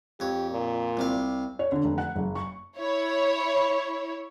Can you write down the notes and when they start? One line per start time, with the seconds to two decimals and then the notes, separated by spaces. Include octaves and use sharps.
0.20 F2 G4 C#5
0.51 A#2
0.97 C2 C3 F5
1.59 C#5
1.72 D3
1.84 F1
1.98 F#5
2.16 F#1
2.35 C#6
2.77 E4 C#5